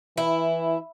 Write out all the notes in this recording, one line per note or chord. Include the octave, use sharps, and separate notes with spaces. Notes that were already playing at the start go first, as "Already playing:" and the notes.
E3 E4